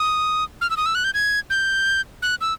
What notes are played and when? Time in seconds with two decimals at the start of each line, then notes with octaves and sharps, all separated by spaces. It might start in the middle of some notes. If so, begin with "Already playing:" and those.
Already playing: D#6
0.61 F6
0.70 E6
0.77 D#6
0.86 E6
0.95 F#6
1.04 G6
1.14 G#6
1.50 G6
2.22 F#6
2.41 E6